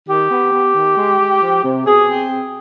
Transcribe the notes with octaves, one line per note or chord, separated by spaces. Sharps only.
D#3 G4
B3
B3
D#3
G#3
G#3
F3
C3
B2 G#4
C4